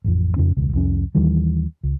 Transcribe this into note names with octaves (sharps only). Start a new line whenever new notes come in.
A1 F2
F2 C#3 C#4
E1 C#2
C2 F2 C#4
D#2 D#3 E3 G3
C#2